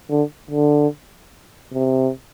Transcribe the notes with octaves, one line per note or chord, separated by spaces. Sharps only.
D3
D3
C3